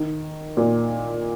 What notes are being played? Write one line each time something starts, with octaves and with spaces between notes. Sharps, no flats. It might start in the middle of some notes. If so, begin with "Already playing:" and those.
Already playing: D#3
A#2